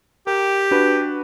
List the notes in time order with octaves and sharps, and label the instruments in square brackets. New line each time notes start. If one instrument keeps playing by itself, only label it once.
[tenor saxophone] G4 [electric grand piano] A#4
[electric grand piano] D4 F#4 B4